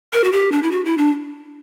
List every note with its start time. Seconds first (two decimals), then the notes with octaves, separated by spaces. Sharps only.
0.13 A#4
0.24 F#4
0.33 G4
0.52 D4
0.63 E4
0.71 F#4
0.85 E4
0.98 D4